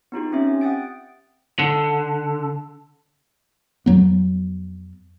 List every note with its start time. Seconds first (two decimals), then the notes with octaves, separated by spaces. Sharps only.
0.12 B3 D#4 F4 G4
0.32 C4 C#4 G4 E5
0.61 F#5 G5 D#6 A6 D7
1.59 D3
3.86 F2 F#3 B3